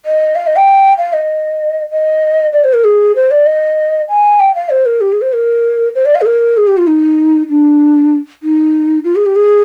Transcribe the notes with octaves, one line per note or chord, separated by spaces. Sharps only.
D#5
F5
D#5
G5
F5
D#5
D#5
D5
C5
A#4
G#4
C5
D5
D#5
G#5
G5
F5
C5
A#4
G4
G#4
C5
A#4
C5
D5
F5
G#4
A#4
G#4
G4
F4
D#4
D4
D#4
F4
G#4
G4
G#4